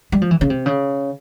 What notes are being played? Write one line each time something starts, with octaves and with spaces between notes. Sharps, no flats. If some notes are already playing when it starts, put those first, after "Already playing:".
G3
F3
E3
C#3
C3
C#3